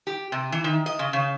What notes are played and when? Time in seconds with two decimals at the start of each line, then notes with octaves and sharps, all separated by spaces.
0.07 G4
0.32 C3
0.52 E3
0.64 D#3
0.86 D#5
0.99 C#3
1.13 C#3